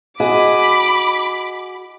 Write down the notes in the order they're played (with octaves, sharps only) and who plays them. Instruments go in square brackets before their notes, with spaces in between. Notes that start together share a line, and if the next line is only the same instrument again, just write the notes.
[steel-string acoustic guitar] F#4 G#4 D#5 [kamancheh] B5 D6